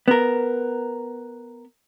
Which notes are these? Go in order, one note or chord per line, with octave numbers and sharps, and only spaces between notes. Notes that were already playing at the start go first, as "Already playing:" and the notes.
B3 A#4